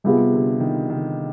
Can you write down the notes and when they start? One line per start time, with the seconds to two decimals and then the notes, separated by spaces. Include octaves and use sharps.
0.04 C3 G3 B3 F4 G#4
0.33 D3
0.60 D#3
0.90 D#3